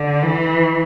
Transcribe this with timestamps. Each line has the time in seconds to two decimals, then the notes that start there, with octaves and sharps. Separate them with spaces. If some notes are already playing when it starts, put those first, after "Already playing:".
Already playing: D3
0.23 E3